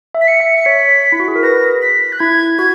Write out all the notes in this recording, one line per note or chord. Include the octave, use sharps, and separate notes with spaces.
E5
B6
E5 C#7
E5
C#7
C#5 B6
E4
F#4
G#4
A#4
B4 A#6
B6
F#6
E4 G#6
F#4 G#6